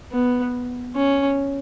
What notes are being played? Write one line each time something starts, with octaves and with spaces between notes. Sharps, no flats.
B3
C#4